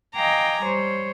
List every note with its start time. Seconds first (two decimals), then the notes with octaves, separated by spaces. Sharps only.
0.15 D#5 F5 G5 G#5 A#5 D6
0.62 G3 C5 C#5